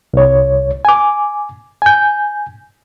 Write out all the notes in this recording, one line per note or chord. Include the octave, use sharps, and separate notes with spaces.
C2 C#5
G#5 D6
G#5 G6